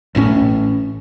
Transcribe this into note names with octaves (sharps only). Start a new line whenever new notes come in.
A1 A2 C#3 C#4